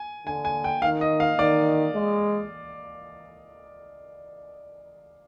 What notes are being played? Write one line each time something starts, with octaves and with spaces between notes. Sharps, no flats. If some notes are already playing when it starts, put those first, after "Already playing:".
Already playing: G#5
D3 G#5
G#5
G5
D#3 F5
D#5
F5
D#3 D5
G#3